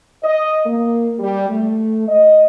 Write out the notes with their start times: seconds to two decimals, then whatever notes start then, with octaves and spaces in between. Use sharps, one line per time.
0.23 D#5
0.66 A#3
1.19 G3
1.49 A3
2.07 D#5